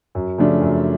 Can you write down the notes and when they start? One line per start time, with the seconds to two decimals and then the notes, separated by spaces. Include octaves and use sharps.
0.15 F#2
0.38 C#3 F3 A3 D4
0.62 F#2